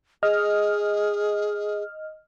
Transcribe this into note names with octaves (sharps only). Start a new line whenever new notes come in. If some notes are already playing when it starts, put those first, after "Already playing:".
G#4 D#5 F6